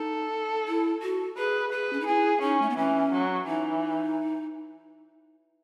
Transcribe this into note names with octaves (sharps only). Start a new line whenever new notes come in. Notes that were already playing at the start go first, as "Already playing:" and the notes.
Already playing: D#4 A4
E4
F#4
G#4 B4
G#4 B4
C#4
D#4
E4 G#4
C#4 D#4
A3
B3
E3 C#4
F#3
E3 D#4